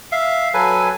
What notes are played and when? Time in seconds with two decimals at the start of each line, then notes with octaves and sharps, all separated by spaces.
0.12 E5 F5
0.54 F#3 A4 B4 G#5